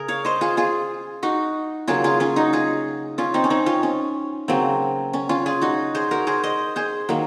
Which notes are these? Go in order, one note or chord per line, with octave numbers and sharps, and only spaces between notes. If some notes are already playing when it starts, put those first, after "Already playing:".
Already playing: C#3 G#4 A#4
C#5 F5
C5 D#5
F4 G#4
F4 G#4
D#4 F#4
C#3 F#3 A#3 F4 G#4
F4 G#4
C#4 F4
D#4 F#4
F4 G#4
C#4 F4
C4 D#4
C#4
C4 D#4
C#4 F4
C#4
C#3 F#3 A#3 C4
C#4
C#4 F4
F4 G#4
D#4 F#4
G#4 C5
F#4 A#4
G#4 C5
C5 D#5
G#4 C5
D#3 F#3 A#3